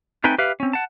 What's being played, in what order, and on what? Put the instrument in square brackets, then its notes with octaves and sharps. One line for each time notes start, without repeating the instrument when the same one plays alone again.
[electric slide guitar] A3 C4 D#4 B4 G5 G#5
G4 B4 E5 F5
C4 C#4
F#5 A5